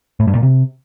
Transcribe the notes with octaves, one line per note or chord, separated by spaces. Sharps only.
A2
G2
A#2
C3